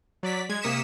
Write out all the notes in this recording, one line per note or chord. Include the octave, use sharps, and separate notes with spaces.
F#3 D5 B6
G#3 G#6
C3 A#3 D#6 B6 C#7 E7